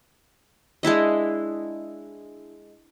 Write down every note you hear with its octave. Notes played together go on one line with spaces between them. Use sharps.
G#3 D4 E4 D#5